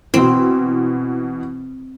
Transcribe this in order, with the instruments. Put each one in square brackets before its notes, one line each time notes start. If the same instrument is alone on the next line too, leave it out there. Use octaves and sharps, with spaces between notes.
[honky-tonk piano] B2 E3 [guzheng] C4